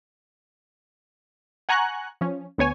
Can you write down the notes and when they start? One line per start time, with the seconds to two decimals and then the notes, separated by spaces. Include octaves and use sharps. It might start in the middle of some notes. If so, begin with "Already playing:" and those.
1.69 F#5 G#5 A#5 C#6 F#6
2.21 F3 C#4
2.58 D2 B3 C#5 G#5